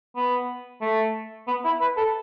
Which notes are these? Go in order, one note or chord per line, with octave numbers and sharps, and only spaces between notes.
B3
A3
B3
E4
B4
A4